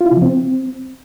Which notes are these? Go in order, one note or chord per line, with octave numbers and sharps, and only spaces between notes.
F4
E4
C3
F3
C4